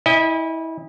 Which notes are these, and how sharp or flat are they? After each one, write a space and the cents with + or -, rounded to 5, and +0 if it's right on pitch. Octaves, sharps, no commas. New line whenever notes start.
E4 -25 D#5 +0 G#5 -45